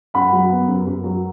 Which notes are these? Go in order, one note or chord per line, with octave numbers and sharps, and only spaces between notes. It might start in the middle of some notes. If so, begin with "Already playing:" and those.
F#2 F#5 B5
F#3
B3
F#2
F#2
F#3